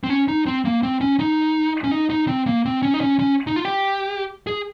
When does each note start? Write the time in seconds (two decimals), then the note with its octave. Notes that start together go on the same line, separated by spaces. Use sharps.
0.04 C4
0.10 C#4
0.28 D#4
0.46 C4
0.65 A#3
0.83 C4
1.01 C#4
1.19 D#4
1.84 C#4
1.91 D#4
2.10 D#4
2.28 C4
2.47 A#3
2.65 C4
2.83 C#4
2.94 D#4
3.01 C#4
3.20 C#4
3.47 D#4
3.56 F4
3.65 G4
4.47 G#4